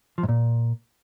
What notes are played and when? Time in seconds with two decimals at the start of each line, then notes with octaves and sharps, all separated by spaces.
0.18 F3
0.23 G#2
0.29 A#2